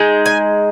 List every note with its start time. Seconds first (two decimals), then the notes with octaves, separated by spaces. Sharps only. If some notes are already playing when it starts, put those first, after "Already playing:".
Already playing: G#3 D#4
0.26 G#5